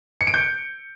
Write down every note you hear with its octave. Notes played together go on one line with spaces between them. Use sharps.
C#7
D7
G6